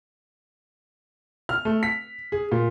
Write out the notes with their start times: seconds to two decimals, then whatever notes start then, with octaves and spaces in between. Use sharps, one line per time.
1.49 F6
1.65 A3
1.83 B6
2.32 G#4
2.52 A#2